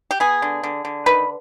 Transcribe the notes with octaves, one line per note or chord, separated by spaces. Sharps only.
G4
B3 G#4
D3
D3
D3
D#3 B4